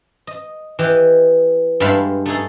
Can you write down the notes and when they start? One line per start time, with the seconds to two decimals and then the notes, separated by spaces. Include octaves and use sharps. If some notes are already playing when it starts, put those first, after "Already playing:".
0.27 D#5
0.79 E3 G4 D#5
1.80 G2 G#3 A4 E5 F5 B5
2.26 A3 D#4 G#4 A4